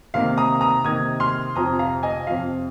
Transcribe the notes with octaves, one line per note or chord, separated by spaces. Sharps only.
C3 D#3 A#3 D#4 F5
A#5 D#6
A#5 D#6
C3 D#3 A#3 D#4 D#6 G#6
C6 F6
F2 C3 F3 A#5 D#6
F5 A#5
D#5 G#5
F2 C3 F3 F5